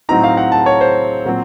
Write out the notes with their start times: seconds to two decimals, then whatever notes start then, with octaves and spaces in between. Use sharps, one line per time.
0.09 A2 F#3 C4 D#4 A#5
0.24 F5
0.37 F#5
0.52 A5
0.66 C#5
0.81 C5
1.25 A#2 F#3 C4